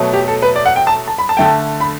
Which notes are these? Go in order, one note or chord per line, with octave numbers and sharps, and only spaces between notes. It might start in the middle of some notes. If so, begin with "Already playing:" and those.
Already playing: B2 F#3 A3
G4
A4
B4
D5
F#5
G5
A5
A5
B5
A5
D3 A3 G5
A5
B5